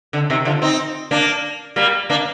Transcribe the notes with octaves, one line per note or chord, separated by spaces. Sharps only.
D3
C3 D#3
D3 F3
C4 D#4
A#3 D4
G3 A#3
A#3 D4